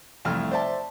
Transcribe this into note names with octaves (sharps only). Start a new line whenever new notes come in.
C2 F2 A3 F6
C5 D5 E5 A5